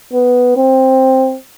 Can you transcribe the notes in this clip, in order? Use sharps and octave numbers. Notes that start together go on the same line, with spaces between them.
B3
C4